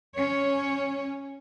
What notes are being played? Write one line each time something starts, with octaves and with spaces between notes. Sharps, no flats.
C#4 C#5